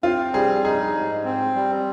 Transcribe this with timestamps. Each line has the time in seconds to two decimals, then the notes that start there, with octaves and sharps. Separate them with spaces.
0.03 C4 F4
0.33 G3 G#4
0.64 D#4 G#4
0.95 G#2
1.24 C4
1.56 G3